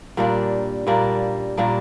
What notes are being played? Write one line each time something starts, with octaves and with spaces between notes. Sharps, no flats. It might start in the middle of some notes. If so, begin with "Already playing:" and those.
A#2 G3 A#3 D4
A#2 G3 A#3 D4
A#2 G3 A#3 D4